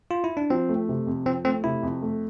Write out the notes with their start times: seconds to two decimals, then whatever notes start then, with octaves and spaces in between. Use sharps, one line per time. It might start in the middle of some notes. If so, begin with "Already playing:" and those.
0.11 F4
0.24 E4
0.37 D4
0.50 F3 C4
0.69 A3
0.89 C3
1.07 F2
1.25 F3 C4
1.45 A3 C4
1.64 C3 E4
1.83 F2
2.02 A3